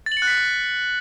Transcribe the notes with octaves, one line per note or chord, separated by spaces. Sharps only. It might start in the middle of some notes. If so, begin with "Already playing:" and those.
A6
F#7
C#7
F#6
B6